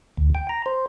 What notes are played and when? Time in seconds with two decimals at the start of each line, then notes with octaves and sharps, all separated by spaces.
0.17 D2
0.35 G5
0.49 A#5
0.66 C5